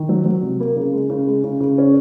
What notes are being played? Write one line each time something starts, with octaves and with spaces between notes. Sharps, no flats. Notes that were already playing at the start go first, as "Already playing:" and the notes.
Already playing: D#3
F#3
F#3
C3
A#3
C#3
G#3
C#3
G#3
C#3
C#3
C#4